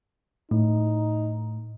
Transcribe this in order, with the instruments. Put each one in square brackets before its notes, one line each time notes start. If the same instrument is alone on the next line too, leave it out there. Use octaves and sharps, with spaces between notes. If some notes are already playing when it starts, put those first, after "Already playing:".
[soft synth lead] A2 [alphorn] D#4